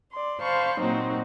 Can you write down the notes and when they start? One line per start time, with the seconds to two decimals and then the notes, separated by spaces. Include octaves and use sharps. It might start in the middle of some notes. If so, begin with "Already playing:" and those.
0.12 D5 C6
0.42 C5 F5 A5 B5 C#6
0.80 A#2 F#3 A#3 C4 D#4 F#4